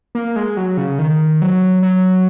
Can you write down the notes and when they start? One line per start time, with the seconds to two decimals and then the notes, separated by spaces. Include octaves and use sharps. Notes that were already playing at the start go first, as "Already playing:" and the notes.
0.15 A#3
0.36 G#3
0.57 F#3
0.77 C#3
0.99 D#3
1.42 F#3
1.83 F#3